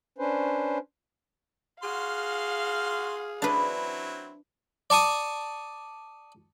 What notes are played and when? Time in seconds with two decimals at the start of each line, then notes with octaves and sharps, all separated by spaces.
0.18 C#4 D4 B4 C5
1.83 F#4 G#4 F5 C6 F6
3.42 F#3 C4 D4 E4 B4
4.90 D5 A5 C#6 D#6